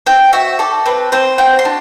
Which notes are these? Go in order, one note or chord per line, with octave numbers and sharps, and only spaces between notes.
C4 G5
F#4 E5
A4 D5
C4 B4
C4 C5
F#4 G5
C6
D4